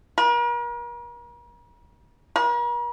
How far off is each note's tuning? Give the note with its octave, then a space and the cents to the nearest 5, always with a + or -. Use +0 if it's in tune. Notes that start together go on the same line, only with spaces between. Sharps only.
A#4 +40
A#4 +45